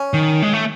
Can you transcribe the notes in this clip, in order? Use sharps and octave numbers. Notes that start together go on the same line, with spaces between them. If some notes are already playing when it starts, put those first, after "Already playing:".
Already playing: C#4
D#3
G#3
A3